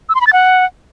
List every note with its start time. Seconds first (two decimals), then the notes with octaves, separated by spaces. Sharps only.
0.09 E6
0.15 C6
0.21 B5
0.27 A6
0.33 F#5